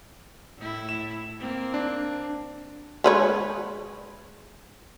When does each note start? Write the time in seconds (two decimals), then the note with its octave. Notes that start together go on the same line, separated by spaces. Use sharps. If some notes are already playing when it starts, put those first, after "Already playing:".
0.57 A2 E4
0.89 E7
1.39 A#3 C4
1.74 D4
3.04 G#3 B4 C#5